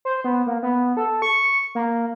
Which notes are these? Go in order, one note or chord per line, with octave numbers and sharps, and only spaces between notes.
C5
B3
A#3
B3
A4
C#6
A#3